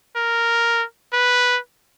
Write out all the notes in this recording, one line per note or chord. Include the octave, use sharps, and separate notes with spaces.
A#4
B4